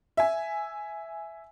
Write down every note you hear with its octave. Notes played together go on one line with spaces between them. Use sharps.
E5 G#5